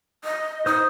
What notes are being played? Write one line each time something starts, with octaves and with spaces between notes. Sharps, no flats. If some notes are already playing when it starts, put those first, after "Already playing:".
D#5
D#4 C5 D#6